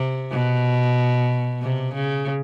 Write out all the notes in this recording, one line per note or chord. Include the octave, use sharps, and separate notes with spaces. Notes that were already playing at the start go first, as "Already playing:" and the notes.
Already playing: C3
B2
C3
C#3